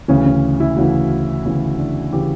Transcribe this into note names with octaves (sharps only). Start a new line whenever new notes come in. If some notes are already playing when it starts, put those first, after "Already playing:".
D2 C#3 E3 C#4
C#4
E4
D2 C#3 E3 F#4
D2 C#3 E3
D4
C#3 E3 G4